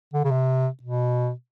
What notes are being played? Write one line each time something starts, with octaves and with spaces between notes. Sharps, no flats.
D3
C#3
C3
B2